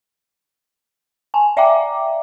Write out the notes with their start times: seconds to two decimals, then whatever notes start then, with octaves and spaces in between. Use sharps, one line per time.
1.34 G#5 A5
1.57 D5 E5 F5 G5 A#5 D6